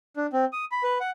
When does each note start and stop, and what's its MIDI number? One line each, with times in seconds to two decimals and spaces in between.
0.17 0.27 62
0.33 0.45 60
0.53 0.65 87
0.72 0.83 83
0.83 0.98 71
1.01 1.10 78